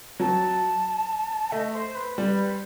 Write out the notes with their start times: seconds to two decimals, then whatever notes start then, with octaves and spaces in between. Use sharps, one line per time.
0.20 F#3 A5
1.51 A3 D#5
1.73 C5
1.95 B4
2.17 G3 B4
2.50 C5